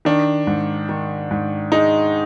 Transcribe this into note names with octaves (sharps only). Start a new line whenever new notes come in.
D#3 D4
G#2
D#3
G#2
G#3 D#4